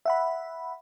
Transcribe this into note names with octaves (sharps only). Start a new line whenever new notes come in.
E5 F#5 B5